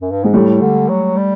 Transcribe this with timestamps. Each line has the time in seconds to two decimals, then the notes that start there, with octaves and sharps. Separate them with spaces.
0.01 F#2
0.11 G2
0.23 G#2 G#3
0.34 A2 G3 A3
0.61 D3
0.89 F#3
1.17 G3